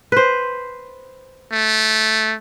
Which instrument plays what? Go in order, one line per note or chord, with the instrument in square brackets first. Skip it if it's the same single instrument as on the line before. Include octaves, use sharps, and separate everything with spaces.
[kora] B4 C5
[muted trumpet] A3